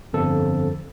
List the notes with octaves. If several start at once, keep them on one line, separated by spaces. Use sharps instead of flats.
G1 F2 A4